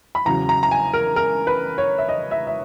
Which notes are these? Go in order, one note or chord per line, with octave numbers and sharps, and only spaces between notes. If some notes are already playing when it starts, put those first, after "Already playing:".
B5
E2 C#3 F#3 A#5
A#5
A#5
G#5
A#4
A#4
B4
C#5
E5
D#5
E5
E5